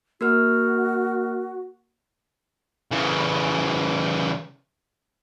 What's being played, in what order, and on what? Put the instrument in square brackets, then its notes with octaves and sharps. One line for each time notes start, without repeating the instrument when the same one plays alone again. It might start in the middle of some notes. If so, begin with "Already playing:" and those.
[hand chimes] A#3 A#4 F6 [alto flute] F#4
[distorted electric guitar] C#3 E3